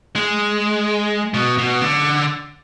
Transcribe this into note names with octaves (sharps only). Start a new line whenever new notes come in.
G#3
B2
B2
D3